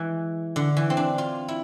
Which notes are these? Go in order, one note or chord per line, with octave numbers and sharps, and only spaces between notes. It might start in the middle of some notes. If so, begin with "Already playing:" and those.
Already playing: E3 G#3
D3
E3
C4
D4
F4
E4